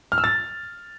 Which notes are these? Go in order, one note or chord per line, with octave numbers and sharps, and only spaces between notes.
F6
E6
A6